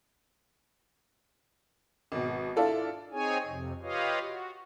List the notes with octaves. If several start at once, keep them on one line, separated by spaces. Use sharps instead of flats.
G#1 B2
D4 E4 F4 A4 D5
C4 D#4 G#4 C#5 G#5
F2 C3
F4 G4 B4 C#5 D#5 F5
F#4